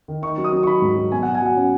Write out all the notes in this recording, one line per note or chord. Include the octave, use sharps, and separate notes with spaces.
D#3
D#4 C#6
F#3
D#6
F#3
C#6
D#4 B5
G#2
F#3
B2 G#5
F#5
B2
G#5
F#3 F#5
C#4